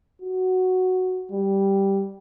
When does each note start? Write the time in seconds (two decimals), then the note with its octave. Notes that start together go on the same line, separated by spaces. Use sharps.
0.22 F#4
1.32 G3